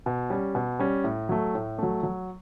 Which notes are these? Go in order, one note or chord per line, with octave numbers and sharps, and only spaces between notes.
B2
G3 C#4
B2
G3 C#4
A2
F#3 A3
A2
F#3 A3
F#3